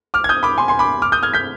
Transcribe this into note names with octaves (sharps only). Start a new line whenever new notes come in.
D6 F6
G#6
D#6 G6
B5 D6
G#5 C6
G#5 C6
B5 D6
D6 F6
D#6 G6
F6 G#6
G6 B6